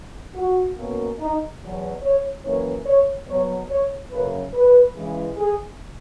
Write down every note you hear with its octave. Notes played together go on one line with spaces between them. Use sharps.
F#4
B2 A#3 C#4
D#4
E2 B2 F#3
C#5
F#2 E3 A#3 C#4 C#5
C#5
B2 F#3 B3 C#5
C#5
F#2 C#3 F#3 A#3 C#4 B4
B4
C#3 E3 G#3
G#4